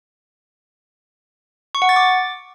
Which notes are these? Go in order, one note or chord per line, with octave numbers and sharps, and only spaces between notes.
C#6
F#5
A6
D6